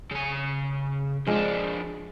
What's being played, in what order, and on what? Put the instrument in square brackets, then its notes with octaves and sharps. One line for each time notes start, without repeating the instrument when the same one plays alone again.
[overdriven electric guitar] C#3 G#5
[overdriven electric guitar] F2 D4 [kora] F3 G#3 F5